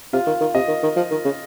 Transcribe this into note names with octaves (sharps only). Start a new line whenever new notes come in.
C3 F4
D#3
D#3
C3 D#5
D#3
D#3
F3
D#3
C#3